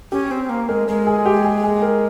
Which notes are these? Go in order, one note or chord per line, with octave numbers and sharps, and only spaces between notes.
C#4 G4
C4
A#3
G#3 A#4
G#3 A#4
G#4
G4
G#4
G#4
A#4